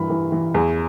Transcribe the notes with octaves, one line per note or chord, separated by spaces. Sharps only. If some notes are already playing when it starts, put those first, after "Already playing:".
Already playing: G2 E3 B5
E3
E3
E2